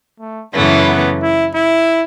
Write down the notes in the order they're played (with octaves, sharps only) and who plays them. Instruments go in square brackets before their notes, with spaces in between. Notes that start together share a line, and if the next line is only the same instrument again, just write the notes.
[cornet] A3
[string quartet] F#2 C#3 E3 A3 C#4 [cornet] B3
[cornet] B3
E4
E4